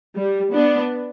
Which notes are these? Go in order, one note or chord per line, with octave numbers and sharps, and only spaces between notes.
G3
B3 D4